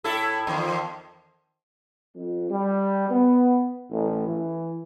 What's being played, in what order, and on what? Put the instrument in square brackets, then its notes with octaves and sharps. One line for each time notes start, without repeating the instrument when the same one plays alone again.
[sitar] A2 E4 A4
E2 D#3 F3
[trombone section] F2
G3
B3
A1
E3